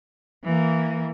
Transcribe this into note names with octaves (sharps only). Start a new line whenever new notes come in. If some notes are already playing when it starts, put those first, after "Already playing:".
E3 A#3